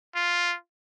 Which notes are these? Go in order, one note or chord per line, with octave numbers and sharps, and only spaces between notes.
F4